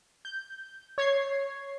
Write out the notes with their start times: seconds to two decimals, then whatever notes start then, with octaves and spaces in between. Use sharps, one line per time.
0.25 G6
0.98 C#5 G#6 C7